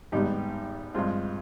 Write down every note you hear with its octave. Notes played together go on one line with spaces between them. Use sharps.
G#1 G#2 G3 B3 D#4 G4
G2 F3 G#3 C4 F4